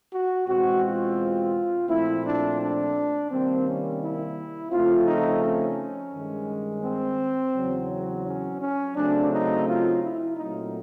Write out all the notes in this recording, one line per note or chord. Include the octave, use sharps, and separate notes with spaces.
F#4
E2 B2 G#3 C4 F#4
F4
A#2 F3 A3 C4 E4
D4
D4
C3 D#3 G3 A#3 C4
C#4
E4
C#3 F3 A3 C4 F4
D#4
C#4
G2 D#3 G#3
C4
E2 C#3 F#3
C4
C#4
C#4
C#3 F#3 A3 C4 D4
D#4
F4
E4
A#2 F#3 A3 C4 D#4